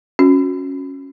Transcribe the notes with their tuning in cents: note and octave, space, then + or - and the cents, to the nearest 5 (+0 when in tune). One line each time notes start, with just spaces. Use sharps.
C#4 -5 F#4 -20